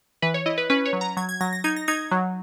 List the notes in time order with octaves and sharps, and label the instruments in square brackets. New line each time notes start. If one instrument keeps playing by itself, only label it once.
[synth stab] E3 B4
C#5
E4 D#5
B4
C#4 B4
C#5
F#3
A#5
F#3 G#6
G#6
F#3 A#6
A#6
D#4 G#6
A#6
D#4 G#6
F#3